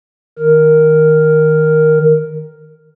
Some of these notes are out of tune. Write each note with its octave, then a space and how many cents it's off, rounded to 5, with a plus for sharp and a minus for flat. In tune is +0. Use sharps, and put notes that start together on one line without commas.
D#3 +5 A#4 +0